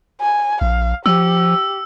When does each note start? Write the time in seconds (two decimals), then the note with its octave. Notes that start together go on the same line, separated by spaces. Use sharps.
0.21 G#5
0.61 A#1 F5
1.06 F3 G4 E6